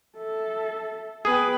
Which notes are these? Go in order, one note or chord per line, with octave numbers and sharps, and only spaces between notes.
A4 E5
B3 G#4 B4 G5